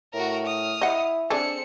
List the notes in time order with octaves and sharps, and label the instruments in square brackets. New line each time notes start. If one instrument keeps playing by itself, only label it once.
[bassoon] A2 [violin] F#4 A#4
[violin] D#6 F6
[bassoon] E4 [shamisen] D#5 F#5
[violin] C4 C#7 [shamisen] D4 G#4 A4